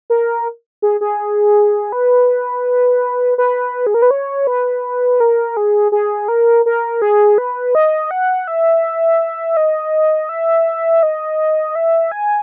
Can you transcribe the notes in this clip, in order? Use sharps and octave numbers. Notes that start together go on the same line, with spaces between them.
A#4
G#4
G#4
B4
B4
G#4
A#4
B4
C#5
B4
A#4
G#4
G#4
A#4
A#4
G#4
B4
D#5
F#5
E5
D#5
E5
D#5
E5
G#5